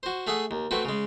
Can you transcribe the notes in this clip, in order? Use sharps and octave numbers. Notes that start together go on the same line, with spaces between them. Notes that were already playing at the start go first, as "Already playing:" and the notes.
F#4 C5
A3 G#4 E5 F#5 D#6
D#2
A3 C4 F#4 B4
C#3 G#3